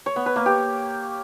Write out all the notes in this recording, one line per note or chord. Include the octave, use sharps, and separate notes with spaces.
C#5
B3
B4
A#3
G4